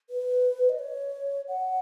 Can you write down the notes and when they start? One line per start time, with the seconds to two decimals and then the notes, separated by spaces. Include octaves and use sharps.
0.10 B4
0.69 D#5
0.79 C#5
1.48 F#5